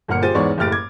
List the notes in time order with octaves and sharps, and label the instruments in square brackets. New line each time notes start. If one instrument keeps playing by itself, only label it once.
[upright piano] G1 A#2 A#3 F#5 F6 C#7
F4 G4 G#4 C5 A6 D#7
E2 G#2 B3 C#5 D5 C#6
F#1 A2 G4 F6 A6 D7
D6 G#6